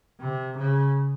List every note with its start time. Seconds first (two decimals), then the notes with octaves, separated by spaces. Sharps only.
0.20 C3
0.57 C#3